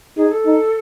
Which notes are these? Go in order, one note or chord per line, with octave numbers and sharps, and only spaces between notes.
D#4 G#4
A4
D#4